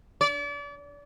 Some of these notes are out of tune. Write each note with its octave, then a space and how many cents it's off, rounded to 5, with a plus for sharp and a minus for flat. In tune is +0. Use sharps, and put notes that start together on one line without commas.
D5 -35